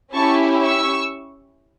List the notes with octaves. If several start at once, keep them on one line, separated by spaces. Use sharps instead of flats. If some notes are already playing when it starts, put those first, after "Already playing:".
C#4 E4 G4 A5 C#6
C#6 E6